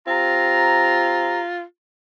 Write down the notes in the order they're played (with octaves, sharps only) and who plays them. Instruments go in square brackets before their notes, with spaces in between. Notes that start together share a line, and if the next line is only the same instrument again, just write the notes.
[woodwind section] C4 G4 A#5 [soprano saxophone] F4